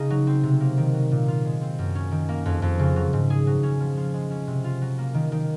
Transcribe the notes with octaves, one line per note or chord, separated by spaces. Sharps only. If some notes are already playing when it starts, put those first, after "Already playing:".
Already playing: C#3 D#4
F#3
C4
C3
A#3
D#3
F#3
A#2
F4
G#3
C4
F#2
C#4
D#3
A#3
F2
F2
C#3
F#3
G#2
G#4
F#3
C#4
F3
F4
G#3
C#4
C3
F4
F#3
A#3
D#3
D#3